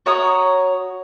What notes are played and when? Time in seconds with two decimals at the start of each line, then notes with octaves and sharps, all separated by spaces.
0.06 F#4 C#5 A#5 D#6